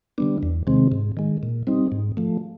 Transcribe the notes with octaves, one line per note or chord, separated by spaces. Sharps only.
D3 G3 B3 D4
E2
C3 D#3 G#3 C4
G#2
D#3 G#3
A#2
G3 C4 D#4
G#2
F3 A3